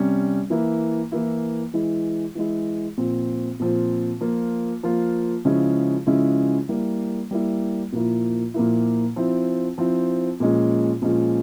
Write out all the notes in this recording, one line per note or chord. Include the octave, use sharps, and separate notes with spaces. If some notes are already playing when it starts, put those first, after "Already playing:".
Already playing: C3 G3 C#4
E3 A#3 E4
E3 A#3 E4
E3 G#3 E4
E3 G#3 E4
A#2 F3 C4
A#2 F3 C4
F3 A#3 F4
F3 A#3 F4
C#3 F3 G#3 C#4 E4
C#3 F3 G#3 C#4 E4
G3 A#3 E4
G3 A#3 E4
A#2 F3 A#3 E4
A#2 F3 A#3 E4
F3 C4 E4
F3 C4 E4
A#2 F3 G#3 C#4
A#2 F3 G#3 C#4